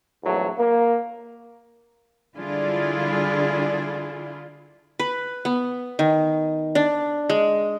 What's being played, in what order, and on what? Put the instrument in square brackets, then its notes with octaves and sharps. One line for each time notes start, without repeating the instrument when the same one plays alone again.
[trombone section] A#1 E2 F#3 A3
A#3
[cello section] D3 G3 D4 E4 F4 G#4
[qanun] B4
B3
D#3
D4
G#3